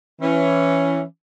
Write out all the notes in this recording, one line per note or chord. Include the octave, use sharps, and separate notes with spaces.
E3 C#4